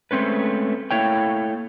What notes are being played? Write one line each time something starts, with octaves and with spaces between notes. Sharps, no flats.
G#3 A3 C4 C#4 B4
A3 A#3 E4 C#5 G5